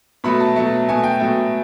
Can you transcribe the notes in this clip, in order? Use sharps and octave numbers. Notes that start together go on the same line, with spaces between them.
B2 F#3 A3 B5
A5
B2 F#3 A3
B2 F#3 A3 G#5
G5
B2 F#3 A3